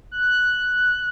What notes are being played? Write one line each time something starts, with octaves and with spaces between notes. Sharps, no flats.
F#6